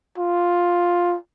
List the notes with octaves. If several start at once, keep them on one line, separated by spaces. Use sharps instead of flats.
F4